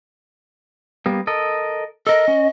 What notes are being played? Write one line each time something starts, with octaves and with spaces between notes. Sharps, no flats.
G3 A#3 B3
A4 A#4 D#5
A4 A#4 D#5
C#4